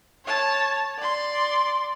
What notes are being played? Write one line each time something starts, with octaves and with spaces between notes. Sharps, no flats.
C#5 A5
D5 C6